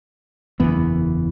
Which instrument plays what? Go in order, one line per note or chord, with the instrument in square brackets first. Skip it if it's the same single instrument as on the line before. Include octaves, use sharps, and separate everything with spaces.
[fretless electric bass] F#1 E2 E3 B3